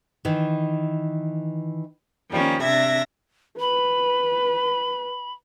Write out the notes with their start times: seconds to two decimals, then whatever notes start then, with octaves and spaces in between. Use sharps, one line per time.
0.25 D#3 E3
2.31 D#3 F3 G3 A#3 C#4
2.63 C3 D4 E5 G#6 A#6
3.60 B4 B5